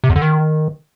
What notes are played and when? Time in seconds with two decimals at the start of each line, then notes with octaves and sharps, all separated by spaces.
0.04 C3
0.10 E2
0.16 D3
0.22 D#3